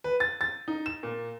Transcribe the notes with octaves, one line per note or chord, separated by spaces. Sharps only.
B4
A6
A6
D#4
E7
A#2